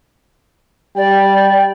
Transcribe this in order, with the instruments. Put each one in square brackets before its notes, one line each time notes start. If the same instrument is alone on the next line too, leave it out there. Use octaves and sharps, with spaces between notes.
[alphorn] G3 [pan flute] D5 [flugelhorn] G5